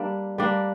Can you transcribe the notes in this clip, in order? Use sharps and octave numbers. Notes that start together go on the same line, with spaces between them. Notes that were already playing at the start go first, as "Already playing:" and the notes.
Already playing: G3 A#3 D4
G3 A#3 D4